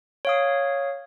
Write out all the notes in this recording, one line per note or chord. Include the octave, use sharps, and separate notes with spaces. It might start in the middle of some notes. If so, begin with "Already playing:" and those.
C#5 F5 D#6